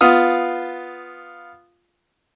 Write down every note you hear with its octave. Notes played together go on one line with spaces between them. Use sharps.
B3 F4 F5 D#6